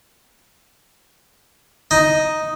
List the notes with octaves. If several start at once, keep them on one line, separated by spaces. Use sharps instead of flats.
D#4